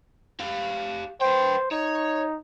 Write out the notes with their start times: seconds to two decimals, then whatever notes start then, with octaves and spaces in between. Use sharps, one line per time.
0.40 G4 F5
1.21 B4 C5 G5
1.71 D#4 C#5